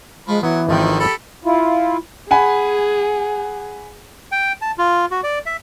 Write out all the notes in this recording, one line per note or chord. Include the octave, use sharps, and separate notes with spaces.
F3 G#3 B5
E3 F#3 B3
G#1 D3 D#3 F3 G5
G4 A4 B5
E4 F4
G#4 F#5 G#5 B5
G5
A5
F4
F#4
D5
E5